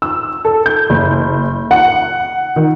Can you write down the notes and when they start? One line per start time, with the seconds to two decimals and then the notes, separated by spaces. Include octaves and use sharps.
0.02 E6
0.45 A4
0.66 G6
0.90 F#1
1.71 F#5
2.56 D#3